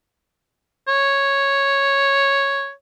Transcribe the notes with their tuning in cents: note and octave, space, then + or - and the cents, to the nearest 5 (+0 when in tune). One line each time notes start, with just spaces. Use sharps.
C#5 -5